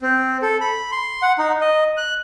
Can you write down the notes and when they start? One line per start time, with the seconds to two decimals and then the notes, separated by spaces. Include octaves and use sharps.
0.02 C4
0.42 A4
0.61 B5
0.92 C6
1.22 F#5
1.39 D#4
1.61 D#5
1.97 F#6